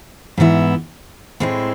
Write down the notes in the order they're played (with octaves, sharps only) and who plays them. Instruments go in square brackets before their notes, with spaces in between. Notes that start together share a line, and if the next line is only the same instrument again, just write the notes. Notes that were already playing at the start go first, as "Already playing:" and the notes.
[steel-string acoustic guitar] G#2 E3 B3 E4
A2 G#3 C4 E4